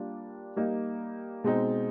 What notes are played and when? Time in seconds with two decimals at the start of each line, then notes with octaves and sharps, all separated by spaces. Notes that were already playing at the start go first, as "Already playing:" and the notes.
Already playing: G3 A#3 D4 F4
0.56 G3 A#3 D#4
1.44 B2 G#3 C4 D#4